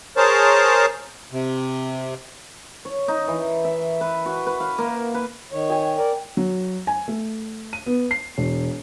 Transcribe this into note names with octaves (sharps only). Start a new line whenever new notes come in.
G#4 A#4 C5 C#5 A5
C3
C#5
D#4
E3
E5
B4
F#4
B4
F5
A#3
B4
D#3 C#5
G5 G#5
A#4 D5
F#3
G#5
A3
D#7
B3
C7
E1